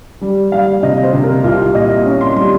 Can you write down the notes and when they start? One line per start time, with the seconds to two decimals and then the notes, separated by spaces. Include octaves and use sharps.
0.21 G3
0.52 G3 F5
0.83 C3 D#5
1.03 C5
1.13 C3
1.24 A#4
1.44 C2 F4
1.75 A#2 D#5
2.05 C#4
2.21 C6
2.36 G3 C6